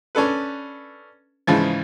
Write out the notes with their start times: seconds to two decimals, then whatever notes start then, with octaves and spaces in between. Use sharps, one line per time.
0.15 C#4 D4 A4 B4
1.47 G#2 C#3 E3 F3